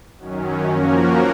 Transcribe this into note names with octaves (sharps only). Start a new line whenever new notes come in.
F#2 D#3 F#3 C#4
F3 A#3 C#4 F#4 A#4